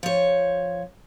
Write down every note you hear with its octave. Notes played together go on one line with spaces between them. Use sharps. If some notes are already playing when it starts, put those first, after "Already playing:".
F3 C#5